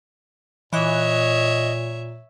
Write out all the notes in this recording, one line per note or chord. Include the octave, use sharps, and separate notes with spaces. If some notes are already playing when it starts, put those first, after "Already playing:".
A#2 E3 C#5 D#5 E5 F#6